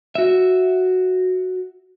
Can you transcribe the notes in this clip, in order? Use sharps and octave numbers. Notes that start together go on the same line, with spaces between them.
F#4 E5